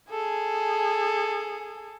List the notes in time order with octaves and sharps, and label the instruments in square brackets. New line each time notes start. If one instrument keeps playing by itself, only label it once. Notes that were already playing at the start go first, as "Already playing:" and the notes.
[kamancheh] G#4 A4